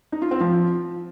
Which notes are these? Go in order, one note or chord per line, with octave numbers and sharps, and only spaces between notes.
D#4
F4
C4
F3